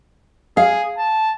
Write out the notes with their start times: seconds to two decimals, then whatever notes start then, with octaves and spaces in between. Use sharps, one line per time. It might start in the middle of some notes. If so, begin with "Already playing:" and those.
0.57 G#4 F5
0.98 A5